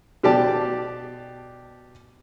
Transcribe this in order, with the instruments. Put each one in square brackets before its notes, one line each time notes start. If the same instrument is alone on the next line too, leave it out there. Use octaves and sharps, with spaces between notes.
[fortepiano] B2 G4 D5 A5